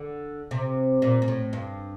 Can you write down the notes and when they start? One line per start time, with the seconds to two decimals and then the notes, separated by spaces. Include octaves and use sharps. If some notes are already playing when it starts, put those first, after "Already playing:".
Already playing: D3
0.51 C3
1.02 A#2
1.22 A#2
1.28 A2
1.53 G2